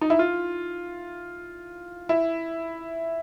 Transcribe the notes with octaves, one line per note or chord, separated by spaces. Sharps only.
D#4
E4
F4
E4